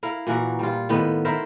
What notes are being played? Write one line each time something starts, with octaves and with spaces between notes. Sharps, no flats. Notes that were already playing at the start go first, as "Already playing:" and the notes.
E4 A#4 F5
A#2 E3 F#4 A#4
G3 F4
A2 D#3 B3
E4 A#4 C5 E5